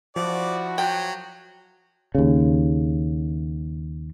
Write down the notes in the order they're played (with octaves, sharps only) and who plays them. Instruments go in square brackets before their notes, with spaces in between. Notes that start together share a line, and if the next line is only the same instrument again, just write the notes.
[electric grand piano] F3 [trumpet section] E4 F#4 [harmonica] D5
[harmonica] F#3 [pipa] G5
[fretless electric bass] D#2 C#3